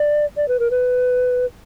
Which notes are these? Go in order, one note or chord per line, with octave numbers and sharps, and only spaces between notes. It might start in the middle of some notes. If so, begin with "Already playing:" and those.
Already playing: D5
D5
B4
A#4
B4